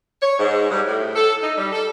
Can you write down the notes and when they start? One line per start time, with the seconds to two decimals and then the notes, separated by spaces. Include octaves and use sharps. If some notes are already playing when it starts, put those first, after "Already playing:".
0.21 C#5
0.39 G#2
0.70 G2
0.87 A2
1.15 A4
1.43 D#4
1.57 G3
1.72 A4